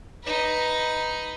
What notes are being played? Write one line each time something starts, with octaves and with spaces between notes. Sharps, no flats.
D#4 B4